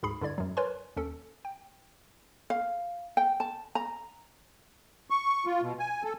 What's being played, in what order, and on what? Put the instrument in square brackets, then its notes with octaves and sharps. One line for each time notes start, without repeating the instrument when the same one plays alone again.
[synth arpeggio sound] D2 G#2 G#4 B5 C7
G2 D3 E4 D5 G#6
F#2 F#3
A#4 B4 C#5 D5 G#5 C6
D#2 C#4 A4
G5
[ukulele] F5
G5
A5
A#5
[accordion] C#6
F4
B2
G#5
A4